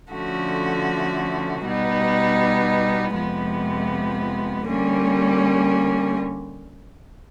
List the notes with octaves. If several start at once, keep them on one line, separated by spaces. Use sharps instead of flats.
D3 F3 A3 C#4 F#4
B2 G3 B3 D#4
F2 C3 F3 G#3 B3
D3 G3 A#3 C#4